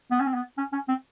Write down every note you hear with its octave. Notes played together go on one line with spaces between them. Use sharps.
B3
C#4
C4
B3
C#4
C#4
C4